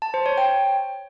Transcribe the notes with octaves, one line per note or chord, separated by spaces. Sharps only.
A5
C5
C#5
G5